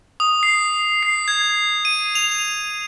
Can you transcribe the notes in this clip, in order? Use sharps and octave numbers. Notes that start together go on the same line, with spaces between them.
D#6
C7
C7
G#6
D#7
F7